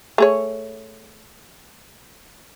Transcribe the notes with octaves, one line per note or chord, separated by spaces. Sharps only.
A3 G#4 C#5